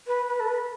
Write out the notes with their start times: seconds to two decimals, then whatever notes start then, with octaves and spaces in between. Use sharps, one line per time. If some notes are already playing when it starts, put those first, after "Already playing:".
0.07 B4
0.28 B4
0.40 A4
0.48 B4